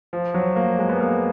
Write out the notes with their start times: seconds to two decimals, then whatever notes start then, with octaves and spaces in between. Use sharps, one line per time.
0.13 F3
0.34 F#3
0.56 A#3
0.79 G#3
0.89 B3
1.01 A#3